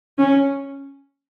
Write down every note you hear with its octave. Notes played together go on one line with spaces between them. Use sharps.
C#4